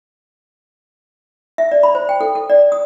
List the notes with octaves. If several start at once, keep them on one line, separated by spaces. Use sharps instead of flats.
E5
D5
B5
C5
G5
A4
A4
D5
D#6